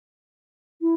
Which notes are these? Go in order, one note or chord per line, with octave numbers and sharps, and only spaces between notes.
E4